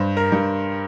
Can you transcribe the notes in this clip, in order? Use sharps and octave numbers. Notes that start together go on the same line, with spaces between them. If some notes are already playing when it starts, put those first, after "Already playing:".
Already playing: G2 C5
A#4
G2